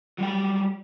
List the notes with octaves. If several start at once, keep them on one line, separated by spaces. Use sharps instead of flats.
F#3 G3 G5